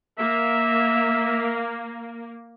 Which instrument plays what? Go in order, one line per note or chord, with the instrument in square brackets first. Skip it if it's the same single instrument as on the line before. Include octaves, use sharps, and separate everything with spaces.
[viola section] A#3 [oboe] E5